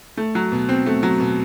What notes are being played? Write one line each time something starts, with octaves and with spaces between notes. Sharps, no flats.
A3
F#3
B2
C4
A3
F#3
B2